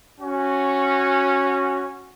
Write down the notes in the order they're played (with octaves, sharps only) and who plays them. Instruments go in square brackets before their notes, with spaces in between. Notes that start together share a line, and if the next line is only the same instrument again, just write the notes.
[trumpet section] C#4 F#4